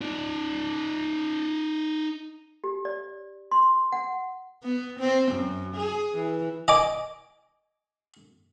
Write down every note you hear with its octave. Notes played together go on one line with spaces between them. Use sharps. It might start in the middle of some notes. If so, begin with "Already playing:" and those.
D#4 D5
G4
D5
C6
F#5
B3
C4
F#2
G#4
E3
D#5 G#5 D6